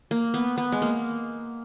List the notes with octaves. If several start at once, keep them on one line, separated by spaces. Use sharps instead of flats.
A#3
B3
B3
G#3
A#3